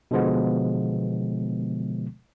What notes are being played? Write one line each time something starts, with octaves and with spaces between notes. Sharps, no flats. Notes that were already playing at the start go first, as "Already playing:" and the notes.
B2 D3 F3 G#3 B3